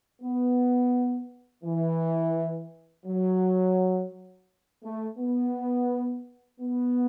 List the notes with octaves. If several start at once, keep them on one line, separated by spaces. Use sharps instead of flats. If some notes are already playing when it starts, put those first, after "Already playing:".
B3
E3
F#3
A3
B3
B3